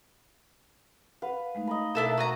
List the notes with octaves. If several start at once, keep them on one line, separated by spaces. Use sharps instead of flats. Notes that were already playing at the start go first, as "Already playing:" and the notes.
B4 F5 F#5
G#3 A3 D#4
D#5 A#5 B5
B2 D4 E4 A4 A#4 F#6
F#4 F5 G#5 A#5